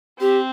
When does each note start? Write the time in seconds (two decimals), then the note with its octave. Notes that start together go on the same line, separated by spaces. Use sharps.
0.20 C4 G4